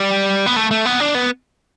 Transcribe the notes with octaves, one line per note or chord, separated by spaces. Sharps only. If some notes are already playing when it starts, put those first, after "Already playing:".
Already playing: G3
B3
A3
A3
B3
D4
B3